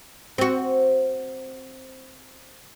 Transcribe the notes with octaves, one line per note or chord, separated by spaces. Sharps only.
C4 F#4